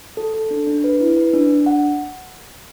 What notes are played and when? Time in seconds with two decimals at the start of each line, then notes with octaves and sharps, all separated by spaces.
0.17 A4
0.34 A4
0.51 D4
0.67 D4
0.84 B4
1.00 E4
1.17 B4
1.33 D4
1.50 D4
1.66 F#5